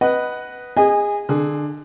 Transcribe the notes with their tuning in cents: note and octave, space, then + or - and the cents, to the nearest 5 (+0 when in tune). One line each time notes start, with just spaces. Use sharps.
B4 +0 D#5 +0 F#5 +15
G#4 -25 D#5 +0 G#5 -15
D3 +25 G#4 +30